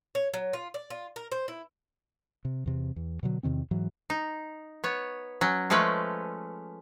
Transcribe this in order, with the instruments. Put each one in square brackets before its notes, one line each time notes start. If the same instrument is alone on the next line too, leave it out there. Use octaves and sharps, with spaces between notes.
[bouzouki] C#5
F#3
F4
D5
F4
A#4
C5
E4
[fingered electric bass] C3
E2 C3
E2
B2 D3 F#3
E2 C3 D#3 C4
G#2 E3 F#3
[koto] D#4
B3 C#5
F#3 C#4
F3 G#3 A3 C#4 B4